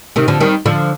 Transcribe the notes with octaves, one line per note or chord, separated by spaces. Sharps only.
C3 D#3
D3 F3
D#3 G3
D3 F3